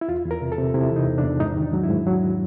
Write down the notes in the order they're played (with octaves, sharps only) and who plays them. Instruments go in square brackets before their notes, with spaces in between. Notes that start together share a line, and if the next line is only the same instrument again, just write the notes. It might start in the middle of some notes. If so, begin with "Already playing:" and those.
[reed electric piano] E4
E2 F4
E2
A#4
C3
A4
C3
C3 E4
E3 D#4
E2
D4
E2
G#2 D#4
D#3
D4
F#3
E4
G#2
F#3